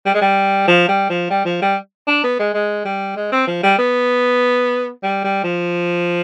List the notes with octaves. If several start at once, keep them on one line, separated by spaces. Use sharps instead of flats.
G3
G#3
G3
F3
G3
F3
G3
F3
G3
D4
B3
G#3
G#3
G3
G#3
C4
F3
G3
B3
G3
G3
F3